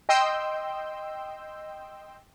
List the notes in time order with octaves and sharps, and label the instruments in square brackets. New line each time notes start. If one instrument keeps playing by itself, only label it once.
[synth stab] D#5 G5 C6 E6 G6